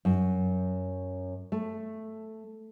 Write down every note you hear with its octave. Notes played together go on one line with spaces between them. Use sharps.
F#2
A3